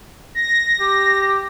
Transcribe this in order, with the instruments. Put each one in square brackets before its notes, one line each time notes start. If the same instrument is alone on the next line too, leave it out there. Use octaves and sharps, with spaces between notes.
[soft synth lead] A#6
[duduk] G4